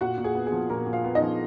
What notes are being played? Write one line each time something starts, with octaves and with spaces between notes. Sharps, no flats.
A#2 F#4 F#5
A#2
G#4
B3
G#4
F3
A#2 A#3 A#4
A#2
F4 F5
B3
D#4 D#5
F3